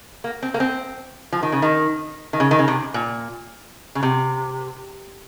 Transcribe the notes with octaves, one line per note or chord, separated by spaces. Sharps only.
A#3
C4
A#3
C4
F3
D#3
C#3
D#3
D#3
C#3
D#3
C#3
C3
A#2
C#3
C3